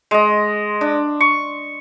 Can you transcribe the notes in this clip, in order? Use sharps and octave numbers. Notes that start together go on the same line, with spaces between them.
G#3 D#5
D4
C#6